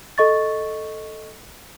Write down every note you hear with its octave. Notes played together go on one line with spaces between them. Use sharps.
A4 D#5 C#6 A6